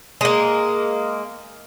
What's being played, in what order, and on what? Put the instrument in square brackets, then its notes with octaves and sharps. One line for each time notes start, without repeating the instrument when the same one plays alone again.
[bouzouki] G#3 A#3